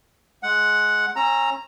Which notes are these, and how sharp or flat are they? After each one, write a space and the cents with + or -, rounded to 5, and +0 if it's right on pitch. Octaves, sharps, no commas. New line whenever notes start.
G#3 +15 F#5 +0
C#4 -30 A#5 +0 E6 +0